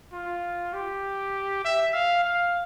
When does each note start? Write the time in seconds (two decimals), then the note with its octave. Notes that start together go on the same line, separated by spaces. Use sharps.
0.12 F4
0.73 G4
1.64 E5
1.94 F5
2.24 F5